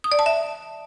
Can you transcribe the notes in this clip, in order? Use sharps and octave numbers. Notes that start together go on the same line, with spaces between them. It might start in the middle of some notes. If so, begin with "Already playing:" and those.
D#6
D5
A5
E5